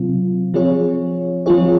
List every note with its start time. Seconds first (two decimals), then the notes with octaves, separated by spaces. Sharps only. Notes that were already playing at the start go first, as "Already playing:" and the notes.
Already playing: C3 F#3 C4 F4
0.54 F3 C4 F4 G#4 C#5
1.46 F3 C4 F4 G#4 C#5